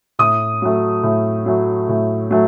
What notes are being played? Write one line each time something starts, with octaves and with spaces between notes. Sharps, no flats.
A2 D#6
F#3 A3
A2
F#3 A3
A2
F#3 A3